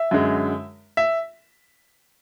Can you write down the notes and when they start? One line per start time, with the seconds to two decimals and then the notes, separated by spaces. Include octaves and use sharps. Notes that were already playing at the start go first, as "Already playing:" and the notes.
Already playing: E5
0.11 F#2 D3 G#3
0.97 E5